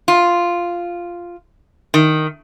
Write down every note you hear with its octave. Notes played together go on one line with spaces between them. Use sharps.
F4
D#3